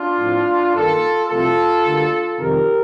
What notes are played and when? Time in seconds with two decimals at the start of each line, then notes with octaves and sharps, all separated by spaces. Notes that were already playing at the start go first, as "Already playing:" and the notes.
Already playing: D4 F4
0.18 A2 F3 C4
0.73 G2 D#3 A#3 F4 A4
1.29 C2 C3 F3 A3 C4 F4 A4
1.83 D2 D3 G3 A#3
2.38 F2 C3 D#3 G3 G4 A#4